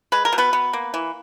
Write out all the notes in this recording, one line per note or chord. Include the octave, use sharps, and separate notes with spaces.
G#3 B4
A#4
B2
B3 B4
B3
A#3
E3